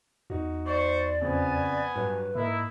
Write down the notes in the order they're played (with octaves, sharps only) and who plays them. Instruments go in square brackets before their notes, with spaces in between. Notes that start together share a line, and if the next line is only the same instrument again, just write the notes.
[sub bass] E2 [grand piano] D#4 F#4
[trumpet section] C5 C#6 [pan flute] D5
[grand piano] F2 C#3 [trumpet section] B3 G#5
[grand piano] G2 F#3 [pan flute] B4
[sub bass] G#2 [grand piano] A#3 A#4 [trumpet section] D#4 E4